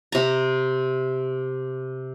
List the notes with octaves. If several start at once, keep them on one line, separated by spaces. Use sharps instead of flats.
C3 A#5